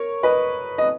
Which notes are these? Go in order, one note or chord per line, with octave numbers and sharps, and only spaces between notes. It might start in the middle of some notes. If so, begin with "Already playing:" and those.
Already playing: A#4 C#5
B4 D#5
D#5